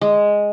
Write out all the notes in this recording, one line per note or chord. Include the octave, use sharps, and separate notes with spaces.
G#3